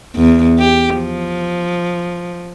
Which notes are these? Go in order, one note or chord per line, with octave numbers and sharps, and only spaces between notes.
E2
G4
F3